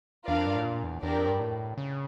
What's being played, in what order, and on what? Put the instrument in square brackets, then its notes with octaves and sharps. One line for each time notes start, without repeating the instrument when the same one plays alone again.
[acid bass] E2 [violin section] D4 F4 A#4 D5 F5
[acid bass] F2
G2
A2
A#2
E2
[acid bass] E2 [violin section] D4 G4 A#4 D5
[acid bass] F2
G2
A2
C#3